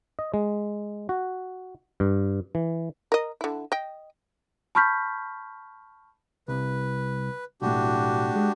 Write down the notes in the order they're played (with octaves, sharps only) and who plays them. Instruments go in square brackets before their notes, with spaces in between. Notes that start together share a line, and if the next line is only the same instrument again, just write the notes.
[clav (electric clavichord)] D#5
G#3
F#4
G2
E3
[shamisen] A#4 D#5
D3 E4
D#5 G5
[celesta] A5 B5 C#6 F6 G6 B6
[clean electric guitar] C2 [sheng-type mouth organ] B4
[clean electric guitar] B1 A2 [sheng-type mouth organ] D4 F#4 G4
[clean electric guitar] G#3